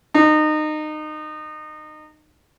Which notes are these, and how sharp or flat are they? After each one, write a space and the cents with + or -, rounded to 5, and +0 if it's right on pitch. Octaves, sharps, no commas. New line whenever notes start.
D#4 -25